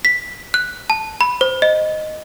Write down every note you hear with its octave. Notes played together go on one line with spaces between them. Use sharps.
B6
F#6
A5
B5
C5
D#5